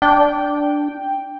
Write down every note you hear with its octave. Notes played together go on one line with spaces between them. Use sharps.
D4 G5